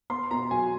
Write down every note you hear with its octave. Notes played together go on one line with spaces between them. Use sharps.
B3 C6
B2 A#5
F#3 G#5